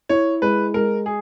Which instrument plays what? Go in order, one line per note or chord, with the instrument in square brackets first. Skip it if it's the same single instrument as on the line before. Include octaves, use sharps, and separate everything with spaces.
[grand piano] E4 [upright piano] C#5
[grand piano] G#3 [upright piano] B4
[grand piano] G#3 [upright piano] A#4
[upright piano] G#4